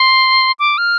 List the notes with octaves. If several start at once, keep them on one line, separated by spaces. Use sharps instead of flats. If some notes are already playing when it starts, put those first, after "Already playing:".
Already playing: C6
D6
F6